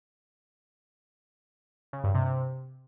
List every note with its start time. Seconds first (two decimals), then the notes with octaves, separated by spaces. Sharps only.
1.93 C#3
2.04 G2
2.15 C3
2.26 C3